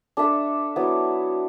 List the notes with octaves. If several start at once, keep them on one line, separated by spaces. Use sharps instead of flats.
D4 A4 E5
F#3 B3 E4